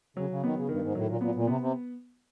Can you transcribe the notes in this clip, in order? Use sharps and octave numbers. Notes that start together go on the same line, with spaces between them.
C#3 F#3
C#3
D#3 B3
C#3
G2 D#3
G#2
A2 F#3
A#2
A#2 B3
A#2
C3 B3
C3